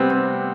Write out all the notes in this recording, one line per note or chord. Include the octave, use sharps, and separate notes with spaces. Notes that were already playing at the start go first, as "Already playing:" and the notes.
Already playing: C3 G3 B3 C4
C4